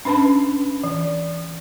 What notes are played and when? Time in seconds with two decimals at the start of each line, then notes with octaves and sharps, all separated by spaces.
0.05 C#4 D4 B4 A5 B5
0.84 E3